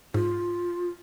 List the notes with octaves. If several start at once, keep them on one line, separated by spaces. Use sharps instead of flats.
G#2 F4